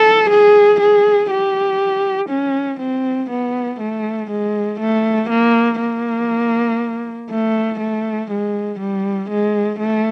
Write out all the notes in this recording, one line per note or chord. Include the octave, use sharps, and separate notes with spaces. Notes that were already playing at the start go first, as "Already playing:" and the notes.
Already playing: A4
G#4
G#4
G4
C#4
C4
B3
A3
G#3
A3
A#3
A#3
A3
A3
G#3
G3
G#3
A3